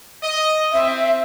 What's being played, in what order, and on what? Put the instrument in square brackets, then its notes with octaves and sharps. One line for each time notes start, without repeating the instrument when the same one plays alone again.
[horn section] D#5
[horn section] C4 [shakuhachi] E5